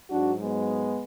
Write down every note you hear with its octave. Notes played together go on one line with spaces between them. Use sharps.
G#2 F#3 D4 F#4
G#3 B3